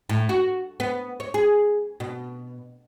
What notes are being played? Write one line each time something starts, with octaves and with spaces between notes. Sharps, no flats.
A2
F#4
B3
C#5
G#4
B2